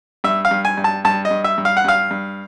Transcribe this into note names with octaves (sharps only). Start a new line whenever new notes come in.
G2 E5
F5
G2
G#5
G2
A5
G2 A5
D#5
G2
E5
G2
F5
F#5
G2 F5
G2